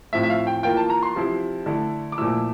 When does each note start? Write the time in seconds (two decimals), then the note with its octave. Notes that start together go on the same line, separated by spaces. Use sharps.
0.13 A2 F3 C4 F4 E5
0.23 E5
0.30 F5
0.47 G5
0.63 E3 A#3 F4 G5
0.77 A5
0.90 A#5
1.03 C6
1.16 C3 F3 C4 E4
1.66 D3 A3 E4
2.12 D6
2.18 A#2 F3 A3 E4 E6